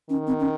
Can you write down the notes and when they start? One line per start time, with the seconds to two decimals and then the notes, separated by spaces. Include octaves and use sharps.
0.10 D#3 C#4
0.27 C4
0.40 C#4